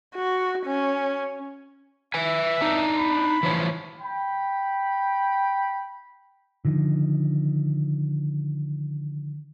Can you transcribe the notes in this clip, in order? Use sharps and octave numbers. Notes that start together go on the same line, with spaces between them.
F#4
C#4
B4 E5 G#5
D4 D#4
B5
E3 F3 C#5
G5 B5
D3 D#3 F3